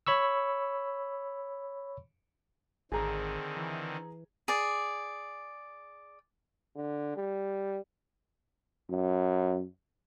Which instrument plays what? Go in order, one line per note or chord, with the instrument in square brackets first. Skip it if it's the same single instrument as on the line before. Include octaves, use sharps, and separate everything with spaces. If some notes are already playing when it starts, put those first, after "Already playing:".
[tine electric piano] C#5 B5 C#6 E6
[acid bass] G#1 [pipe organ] D3 D#3 C4 [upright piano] G#4 A#5
[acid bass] E3
[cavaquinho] G#4 D5
[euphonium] D3
G3
[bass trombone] F#2